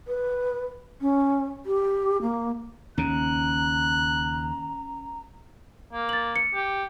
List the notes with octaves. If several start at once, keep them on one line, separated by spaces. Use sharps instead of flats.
B4
C#4
G4
A#3
D#2 C#3 C#4 A#5 F#6
A#3
A6 F#7
C#7
G4